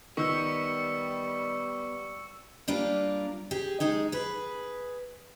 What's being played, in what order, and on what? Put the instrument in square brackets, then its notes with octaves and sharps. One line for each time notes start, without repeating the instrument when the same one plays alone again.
[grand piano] D#3 [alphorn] G3 [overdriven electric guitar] B3 [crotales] C#6 E6 C#7
[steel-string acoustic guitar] G3 A#3 D4 F4 A#4
G4 G#4
G#3 D#4 G#4
G#4 B4